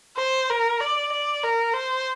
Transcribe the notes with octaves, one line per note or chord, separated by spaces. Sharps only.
C5
A#4
D5
D5
A#4
C5